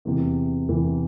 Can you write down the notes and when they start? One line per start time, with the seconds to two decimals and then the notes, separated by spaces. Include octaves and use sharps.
0.05 E2 C3 E3
0.69 E2 C3 E3